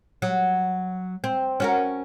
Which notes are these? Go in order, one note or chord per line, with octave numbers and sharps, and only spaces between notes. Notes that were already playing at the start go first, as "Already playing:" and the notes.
F#3
C4
C#4 F#4 A#4